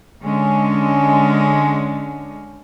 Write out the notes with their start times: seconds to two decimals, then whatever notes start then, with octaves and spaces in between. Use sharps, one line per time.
0.23 D3 G#3 C#4